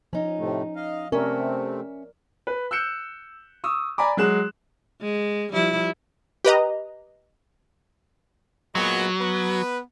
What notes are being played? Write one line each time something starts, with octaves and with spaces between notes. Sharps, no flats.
F3 C#4 D#4
A2 C3 A3
D#5 F5
C3 A3 C4 C#4 A#4 D5 E5
B4
E6 F#6 G6 C#7 E7
C#6 D#6 E6
D5 G#5 A#5 B5 D6
F#3 G#3 F#6 E7
G#3
F3 G3 E4
G4 B4 D#5 A#5
A#2 F#3 G#3 B3
B3 B4